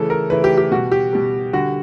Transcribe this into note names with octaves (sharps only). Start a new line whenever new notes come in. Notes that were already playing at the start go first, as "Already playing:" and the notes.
Already playing: C#3 E3 A3 A4
A#4
C#3 E3 A3 B4
G4
G4
B2 G3 F#4
G4
B2 G3
D3 G3 F#4